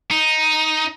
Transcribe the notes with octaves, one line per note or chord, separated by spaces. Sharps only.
D#4